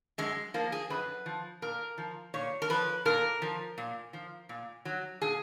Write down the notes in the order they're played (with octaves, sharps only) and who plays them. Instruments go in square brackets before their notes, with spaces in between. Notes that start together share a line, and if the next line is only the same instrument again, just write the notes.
[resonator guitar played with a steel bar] F#2 G#3
F3 A#3
G#4
F#2 B4
F3
A#2 A#4
F3
A#2 C#5
A#4
F3 B4
A#2 A#4
F3
A#2
F3
A#2
F#3
A#2 G#4